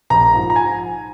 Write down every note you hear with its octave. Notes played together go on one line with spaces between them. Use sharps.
A#1 A#5
G#2 F3
A#5
G#5